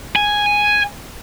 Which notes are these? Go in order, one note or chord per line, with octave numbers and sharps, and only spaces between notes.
G#5